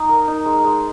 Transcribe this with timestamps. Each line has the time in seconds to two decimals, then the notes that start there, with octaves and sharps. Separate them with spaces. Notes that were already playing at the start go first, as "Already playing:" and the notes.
Already playing: D#4 D#5
0.09 A#4
0.28 D#4
0.46 G#3
0.64 G#3